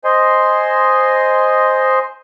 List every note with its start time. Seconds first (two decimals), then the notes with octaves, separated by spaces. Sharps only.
0.04 C5 D#5 G#5 C6